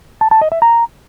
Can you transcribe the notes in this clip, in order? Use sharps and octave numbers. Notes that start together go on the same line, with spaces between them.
A5
A5
D#5
E5
A#5